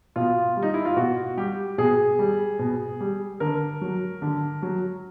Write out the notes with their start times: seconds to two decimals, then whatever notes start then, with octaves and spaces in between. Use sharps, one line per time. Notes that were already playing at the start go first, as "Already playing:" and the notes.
0.16 B2 F4
0.57 G3
0.62 D#4
0.74 E4
0.85 F4
0.96 B2 F#4
1.37 G3 G4
1.78 B2 G#4
2.19 G3
2.59 B2
3.00 G3
3.40 D3 A#4
3.81 F#3
4.22 D3
4.62 F#3